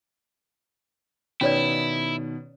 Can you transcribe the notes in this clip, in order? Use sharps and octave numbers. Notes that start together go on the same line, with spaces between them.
B2 D#3 B3 C#4 E4 C#5 D5